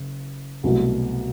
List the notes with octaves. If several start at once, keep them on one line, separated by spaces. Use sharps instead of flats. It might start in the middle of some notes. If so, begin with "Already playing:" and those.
Already playing: F#1
C2 B2 F#3 A3